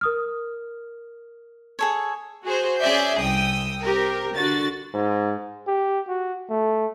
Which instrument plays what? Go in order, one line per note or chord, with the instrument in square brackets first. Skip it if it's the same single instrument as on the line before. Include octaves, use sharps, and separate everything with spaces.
[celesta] A#4 D#6 F6
[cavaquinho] G#4 A4 C#5
[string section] F#4 G#4 C5
C#4 G#4 D5 E5 G6
C2 G5 D#6 E6
C4 G4 A#4
D3 F#4 A6
[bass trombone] G#2
[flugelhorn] G4
F#4
A3